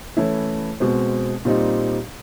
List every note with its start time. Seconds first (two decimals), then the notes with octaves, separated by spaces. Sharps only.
0.17 E3 A3 C#4 E4
0.80 B2 G#3 C4
1.45 A#2 G3 C4 D#4